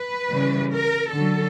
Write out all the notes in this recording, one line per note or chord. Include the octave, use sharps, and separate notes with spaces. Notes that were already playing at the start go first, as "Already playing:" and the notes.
Already playing: B4
C#3 E3 G3
A#4
D3 F#3 A4